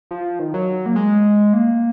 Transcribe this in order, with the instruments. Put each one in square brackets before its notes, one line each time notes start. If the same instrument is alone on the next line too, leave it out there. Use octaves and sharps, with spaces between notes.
[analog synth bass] F3
D#3
F#3
A#3
G#3
A#3